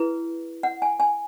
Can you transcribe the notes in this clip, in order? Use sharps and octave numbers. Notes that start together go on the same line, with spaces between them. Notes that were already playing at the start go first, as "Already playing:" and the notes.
Already playing: E4 G#4 B4
F#5
G#5
G#5